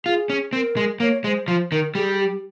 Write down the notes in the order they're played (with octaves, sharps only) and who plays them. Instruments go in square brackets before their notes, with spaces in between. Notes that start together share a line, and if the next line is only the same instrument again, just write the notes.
[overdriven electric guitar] F4 [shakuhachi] G#4
[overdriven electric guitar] C#4
[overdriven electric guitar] C4 [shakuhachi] A#4
[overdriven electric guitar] G#3
[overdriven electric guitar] A#3 [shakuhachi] C#5
[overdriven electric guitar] G#3 [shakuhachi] C5
[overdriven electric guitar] F3 [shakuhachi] C5
[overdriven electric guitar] D#3 [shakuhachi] A#4
[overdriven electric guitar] G3 [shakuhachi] G#4
[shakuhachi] G4